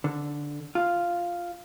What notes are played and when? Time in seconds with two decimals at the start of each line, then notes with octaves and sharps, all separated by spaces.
0.04 D3
0.75 F4